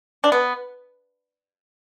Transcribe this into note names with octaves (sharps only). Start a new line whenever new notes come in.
D4
B3